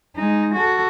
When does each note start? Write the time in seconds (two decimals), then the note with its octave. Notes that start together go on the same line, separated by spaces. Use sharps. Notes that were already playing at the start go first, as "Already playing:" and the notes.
0.16 G#3 D#4
0.55 F#4 A4